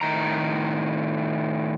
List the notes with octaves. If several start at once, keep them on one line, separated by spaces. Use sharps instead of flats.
A2 D#3 A#5